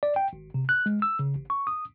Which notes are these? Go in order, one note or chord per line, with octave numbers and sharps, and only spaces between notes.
D5
G5
G#1
C3
F#6
G#3
E6
C#3
A1
C#6
D#6